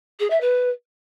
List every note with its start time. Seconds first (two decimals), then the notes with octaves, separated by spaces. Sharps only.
0.19 G#4
0.30 E5
0.40 B4